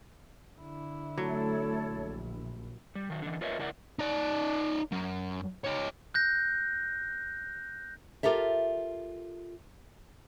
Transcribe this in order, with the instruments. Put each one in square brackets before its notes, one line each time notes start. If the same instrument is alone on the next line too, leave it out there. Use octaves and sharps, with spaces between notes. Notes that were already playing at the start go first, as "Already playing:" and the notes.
[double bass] D3 E4
[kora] F#3 [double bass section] A3 [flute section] A4 C#5
[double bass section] A#1
[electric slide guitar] G3
D#3 F#3
D3 E3
F4 A#4 B4 C#5 D#5 E5
C#3 E4 A#4 D5 F#5
[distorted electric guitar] D#4 D5
F#2
D#4 C#5
[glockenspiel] F#6 G6 A#6
[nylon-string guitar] F4 G4 A4 A#4 E5